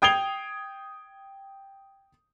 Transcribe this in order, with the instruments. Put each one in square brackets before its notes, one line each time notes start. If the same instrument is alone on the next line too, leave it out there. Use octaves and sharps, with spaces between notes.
[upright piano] G5 D#6 G#6 C7 F7 G7